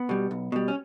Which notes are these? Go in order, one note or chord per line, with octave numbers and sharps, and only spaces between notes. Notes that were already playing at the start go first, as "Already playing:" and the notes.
Already playing: B3
B2 G3
B1
B2 G3
C#4